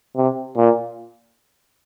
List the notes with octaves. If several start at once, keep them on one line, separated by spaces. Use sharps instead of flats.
C3
A#2